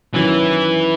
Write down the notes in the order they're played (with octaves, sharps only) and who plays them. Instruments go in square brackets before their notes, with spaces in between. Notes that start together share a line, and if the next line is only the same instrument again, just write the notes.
[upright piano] F#2 D#3 F#3 [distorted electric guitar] E3